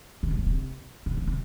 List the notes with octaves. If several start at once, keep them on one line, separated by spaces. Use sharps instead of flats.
C#3
C3
A#2
C3
A#2
C3
C3